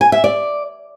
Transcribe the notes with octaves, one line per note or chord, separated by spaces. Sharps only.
G#5
E5
D5